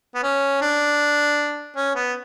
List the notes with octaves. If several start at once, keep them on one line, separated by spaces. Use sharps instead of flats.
B3
C#4
D4
C#4
B3